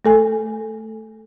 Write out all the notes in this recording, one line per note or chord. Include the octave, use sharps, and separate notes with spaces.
A3 A4 G#5